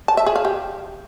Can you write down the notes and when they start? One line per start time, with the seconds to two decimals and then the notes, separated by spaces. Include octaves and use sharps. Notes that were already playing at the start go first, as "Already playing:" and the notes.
0.08 A5
0.17 E5
0.26 G#4
0.36 F5
0.45 G4